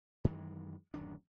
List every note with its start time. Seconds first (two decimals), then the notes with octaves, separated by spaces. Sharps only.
0.24 F#2 D#3 E3 G#3
0.94 D1 F#2 D#3 D4